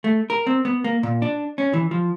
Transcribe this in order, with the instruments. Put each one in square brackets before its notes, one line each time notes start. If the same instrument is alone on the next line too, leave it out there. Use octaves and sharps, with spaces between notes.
[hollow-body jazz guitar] A3
A#4
C4
B3
A#3
A#2
D4
C#4
E3
F3